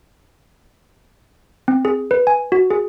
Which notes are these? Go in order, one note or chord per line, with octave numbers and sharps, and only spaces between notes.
C4
G#4
B4
G#5
F#4
G#4